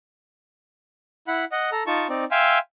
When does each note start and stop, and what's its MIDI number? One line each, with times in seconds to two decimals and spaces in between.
1.28 1.45 64
1.28 1.45 78
1.28 1.45 83
1.52 1.70 75
1.52 1.70 78
1.72 1.83 69
1.72 1.83 82
1.87 2.07 63
1.87 2.07 65
1.87 2.07 81
1.87 2.07 85
2.09 2.24 60
2.09 2.24 63
2.09 2.24 74
2.31 2.59 76
2.31 2.59 77
2.31 2.59 79
2.31 2.59 80
2.31 2.59 84
2.31 2.59 88